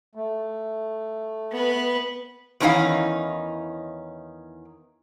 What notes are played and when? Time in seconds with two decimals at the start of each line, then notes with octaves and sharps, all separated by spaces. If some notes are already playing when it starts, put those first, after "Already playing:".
0.15 A3
1.52 B3 B4
2.60 E2 D#3 C#4 D#4 E4 F5